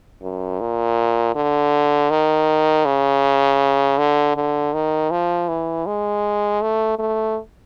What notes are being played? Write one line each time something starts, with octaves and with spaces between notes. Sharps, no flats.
F#2
A#2
D3
D#3
C#3
D3
D3
D#3
F3
E3
G#3
A3
A3